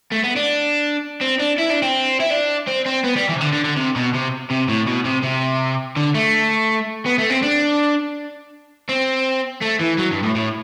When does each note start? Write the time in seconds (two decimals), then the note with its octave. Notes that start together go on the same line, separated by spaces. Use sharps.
0.12 A3
0.24 B3
0.36 D4
1.21 C4
1.39 D4
1.58 E4
1.70 D4
1.82 C4
2.20 E4
2.31 D4
2.67 C4
2.86 C4
3.04 B3
3.16 G3
3.29 E3
3.36 C3
3.41 D3
3.53 D3
3.65 D3
3.76 C3
3.96 B2
4.14 C3
4.50 C3
4.68 A2
4.87 B2
5.05 C3
5.23 C3
5.96 D3
6.14 A3
7.06 B3
7.18 A3
7.30 C4
7.42 D4
8.89 C4
9.61 A3
9.79 E3
9.98 F#3
10.11 G2
10.23 A2
10.35 A2